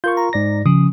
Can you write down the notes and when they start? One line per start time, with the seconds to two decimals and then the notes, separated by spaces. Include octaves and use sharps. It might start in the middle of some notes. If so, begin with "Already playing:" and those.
0.04 F4 A#4 C#6 G6
0.17 A#5
0.33 G#2 D5 A#6
0.66 C#3 F3 D#6